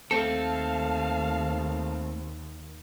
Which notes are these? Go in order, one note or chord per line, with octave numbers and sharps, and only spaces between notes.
D#2 A3 C4 A4 F5 A5